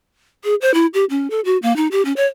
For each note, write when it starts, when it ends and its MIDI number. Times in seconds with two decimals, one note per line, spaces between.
0.44 0.55 68
0.61 0.74 72
0.74 0.86 64
0.94 1.05 67
1.10 1.30 61
1.30 1.40 69
1.45 1.57 66
1.62 1.75 58
1.76 1.88 63
1.91 2.03 67
2.05 2.13 61
2.16 2.26 73